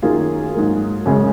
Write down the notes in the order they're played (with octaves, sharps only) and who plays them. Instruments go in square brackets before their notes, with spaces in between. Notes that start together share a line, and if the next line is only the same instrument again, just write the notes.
[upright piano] F#2 D#3 F#3 A#3 F4 G#4
G#2 F#3 A#3
F#2 C#3 G#3